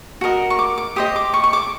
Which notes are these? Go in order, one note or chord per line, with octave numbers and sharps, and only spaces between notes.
F#4 A#4 D#5
C#6
D6
D6
G4 C5 D#5 D#6
D6
C#6
C#6
D6